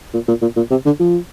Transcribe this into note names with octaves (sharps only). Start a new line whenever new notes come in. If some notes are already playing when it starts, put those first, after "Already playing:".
A#2
A#2
A#2
A#2
C3
D3
F3